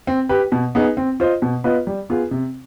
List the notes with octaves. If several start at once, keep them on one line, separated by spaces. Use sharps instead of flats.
C4
G4 B4
B2
B3 D#4 G#4
C4
F4 C5 D#5
B2
B3 F4 B4 D#5
G3
B3 F4 G#4
C3